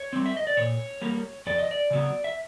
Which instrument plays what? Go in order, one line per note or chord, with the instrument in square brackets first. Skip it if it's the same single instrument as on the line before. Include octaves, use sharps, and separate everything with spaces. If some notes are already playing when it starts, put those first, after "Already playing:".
Already playing: [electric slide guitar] C#5
G3 C4
E5
D#5
D5
A#2 C#5
G3 A#3
F2 D5
D#5
D5
C#3 F#3 B3
E5